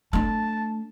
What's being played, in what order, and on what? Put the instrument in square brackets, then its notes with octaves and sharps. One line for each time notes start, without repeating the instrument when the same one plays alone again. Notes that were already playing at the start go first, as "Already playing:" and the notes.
[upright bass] A3 D4 [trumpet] A5